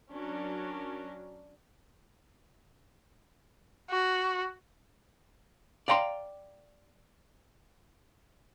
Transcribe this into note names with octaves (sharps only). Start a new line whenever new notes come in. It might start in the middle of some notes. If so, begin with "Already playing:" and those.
F#3 C#4 D4 A#4
F#4
D5 F5 G5 A#5 C6